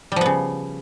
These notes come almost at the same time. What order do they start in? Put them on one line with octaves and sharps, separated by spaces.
G3 F3 B3 C#3